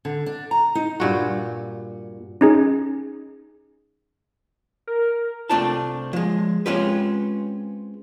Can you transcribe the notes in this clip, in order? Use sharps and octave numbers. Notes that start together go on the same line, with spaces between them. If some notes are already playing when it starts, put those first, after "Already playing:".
D3
D4
A#5
D#4
G2 A#2 F#4
C#4 D#4 G#4
A#4
C2 A3 C4 D4 F4 A5
F3 G#3
G#3 C4 C#4 F4 G4 B4